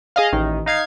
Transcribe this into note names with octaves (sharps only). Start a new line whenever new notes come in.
G#4 D#5 F5
A1 D#3
D#4 F5 G#6 C7